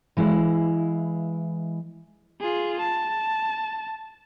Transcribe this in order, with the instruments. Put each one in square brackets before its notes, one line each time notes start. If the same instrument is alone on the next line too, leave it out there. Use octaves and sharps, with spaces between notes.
[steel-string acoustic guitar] E3 G#3 E4 F5
[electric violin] F4 G#4
A5